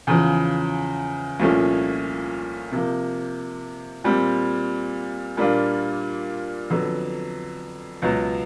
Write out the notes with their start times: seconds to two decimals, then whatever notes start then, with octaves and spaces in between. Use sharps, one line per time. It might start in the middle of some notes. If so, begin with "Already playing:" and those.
0.07 E2 C#3 F3
1.40 C2 A#2 F3 A3 C#4
2.72 C3 F3 A#3
4.04 A#2 G3 C4
5.37 A#2 G3 A#3 D4 F4
6.70 F2 D3 F#3 B3
8.02 C#2 B2 F#3 B3